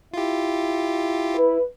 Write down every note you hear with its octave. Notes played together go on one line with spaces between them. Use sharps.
E4 F4 G4
B4